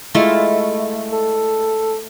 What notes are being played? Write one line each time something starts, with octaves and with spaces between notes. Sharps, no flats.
G#3 A3 E4 F4
A4